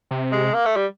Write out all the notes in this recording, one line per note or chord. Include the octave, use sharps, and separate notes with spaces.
C3
G#3
A#3
A3
G3